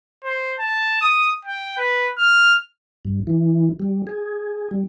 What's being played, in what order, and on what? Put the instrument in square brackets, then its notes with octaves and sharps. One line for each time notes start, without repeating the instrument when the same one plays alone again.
[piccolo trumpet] C5
A5
D#6
G5
B4
F6
[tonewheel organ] G2
E3
G3
G#4
G3